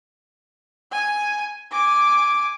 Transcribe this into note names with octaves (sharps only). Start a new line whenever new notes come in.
G#5
G#5 D6